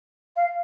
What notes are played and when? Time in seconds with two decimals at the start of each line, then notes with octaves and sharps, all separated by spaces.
0.36 F5